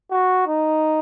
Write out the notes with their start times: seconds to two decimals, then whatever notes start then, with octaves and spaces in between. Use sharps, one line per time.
0.11 F#4
0.47 D#4